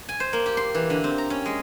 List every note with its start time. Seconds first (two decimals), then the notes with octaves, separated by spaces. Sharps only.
0.09 G#5
0.20 C5
0.33 A#3
0.46 G4
0.57 C6
0.74 E3
0.90 D3
1.04 C4
1.18 A#5
1.30 C#4
1.46 G#3